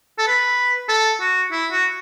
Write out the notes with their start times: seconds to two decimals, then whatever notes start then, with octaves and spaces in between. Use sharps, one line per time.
0.18 A4
0.27 B4
0.89 A4
1.20 F#4
1.52 E4
1.71 F#4